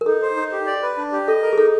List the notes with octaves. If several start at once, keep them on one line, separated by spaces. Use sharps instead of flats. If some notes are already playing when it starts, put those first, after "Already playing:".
A#4
D#4 A4
C5
D#4
G4
D5
B4
D4
G4
A4 D#5
A#4
G#4
D#4 A4